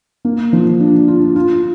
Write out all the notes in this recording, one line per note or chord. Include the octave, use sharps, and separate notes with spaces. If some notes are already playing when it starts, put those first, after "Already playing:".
A#3
F3
D4
F4
F4